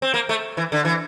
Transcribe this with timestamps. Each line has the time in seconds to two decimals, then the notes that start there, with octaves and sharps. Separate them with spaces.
0.02 C4
0.14 A#3
0.29 A3
0.57 E3
0.72 D3
0.85 E3